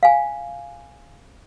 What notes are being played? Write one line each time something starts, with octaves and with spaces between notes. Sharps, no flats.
F5 G#5